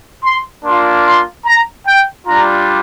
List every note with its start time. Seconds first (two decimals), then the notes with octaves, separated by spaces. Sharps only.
0.25 C6
0.65 A#3 D4 F4 C6
1.05 C6
1.46 A#5
1.87 G5
2.27 G3 D4 F4 A#5